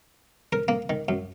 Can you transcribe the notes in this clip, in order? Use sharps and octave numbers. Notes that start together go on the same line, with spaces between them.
A#4
A#3
D#3
F#2